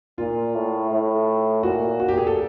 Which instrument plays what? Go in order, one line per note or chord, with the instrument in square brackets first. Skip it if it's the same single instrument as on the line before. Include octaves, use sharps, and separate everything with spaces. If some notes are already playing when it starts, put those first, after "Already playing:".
[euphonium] A#2 [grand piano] F4
[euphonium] A2
A2
[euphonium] A#2 [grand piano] F#4
[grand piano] F#4
G4
G#4
A4